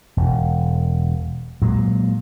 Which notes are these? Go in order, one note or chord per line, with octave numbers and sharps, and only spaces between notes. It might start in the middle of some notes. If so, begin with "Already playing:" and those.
E1
A#2 F#3 G#3